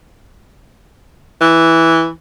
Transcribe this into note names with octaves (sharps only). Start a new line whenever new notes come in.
E3